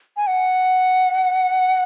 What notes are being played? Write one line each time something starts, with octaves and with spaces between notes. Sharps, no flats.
G#5
F#5